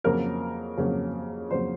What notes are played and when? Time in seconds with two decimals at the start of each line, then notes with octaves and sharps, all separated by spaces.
0.04 F2 C#3 F#3 A#3 A#4
0.78 F2 C#3 F#3 A#3
1.51 F2 C#3 F#3 A#3 C5